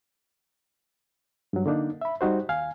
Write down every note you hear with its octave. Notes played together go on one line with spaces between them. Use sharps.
G2 F#3
D3 A#3 D4 D#4
E5 B5
G3 D#4 F#4 C5
D#2 F5 G#5